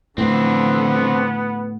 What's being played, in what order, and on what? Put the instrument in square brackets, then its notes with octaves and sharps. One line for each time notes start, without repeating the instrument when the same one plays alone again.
[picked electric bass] A2 [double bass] D3 F3 [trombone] B3 [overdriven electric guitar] C4 D4